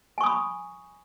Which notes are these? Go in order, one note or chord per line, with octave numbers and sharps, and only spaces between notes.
G#5 B5 C#6 D#6